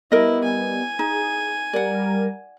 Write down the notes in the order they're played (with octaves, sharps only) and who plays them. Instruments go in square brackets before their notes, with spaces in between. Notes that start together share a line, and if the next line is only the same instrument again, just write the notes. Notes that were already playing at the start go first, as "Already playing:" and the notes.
[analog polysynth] G3 B3 [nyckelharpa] E4 [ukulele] A#4 D#5
[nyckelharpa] G#5
[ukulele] D#4 [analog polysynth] G#4
[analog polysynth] G3 A#4 [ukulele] D5 F#5